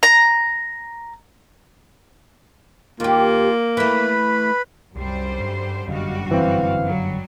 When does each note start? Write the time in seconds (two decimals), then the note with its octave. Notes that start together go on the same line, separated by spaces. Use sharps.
0.03 A#5
3.00 D#2 A#3 F4 G4
3.77 E3 A3 B4 B5
4.96 C2 F#2 D3 G3 G4 C5
5.40 G2
5.88 G1 F#2 D3 G3 F#4 G4 D#5 F5
6.31 E3 C4 F5
6.83 F#3 G3